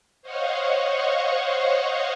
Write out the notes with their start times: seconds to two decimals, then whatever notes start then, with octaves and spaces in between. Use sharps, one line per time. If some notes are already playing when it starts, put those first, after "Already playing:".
0.22 C5 C#5 D#5 F5 F#5 C#6